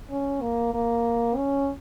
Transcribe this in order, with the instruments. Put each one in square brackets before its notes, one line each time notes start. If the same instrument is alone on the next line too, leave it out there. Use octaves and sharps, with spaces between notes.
[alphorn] C#4
A#3
A#3
C#4